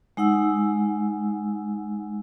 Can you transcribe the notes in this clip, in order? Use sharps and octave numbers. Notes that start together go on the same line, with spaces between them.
G#3 D#4 F#5 E6